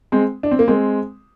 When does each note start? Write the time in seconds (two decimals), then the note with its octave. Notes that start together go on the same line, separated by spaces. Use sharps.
0.12 G#3 C4
0.43 D4
0.51 C4
0.59 A#3
0.68 G#3 C4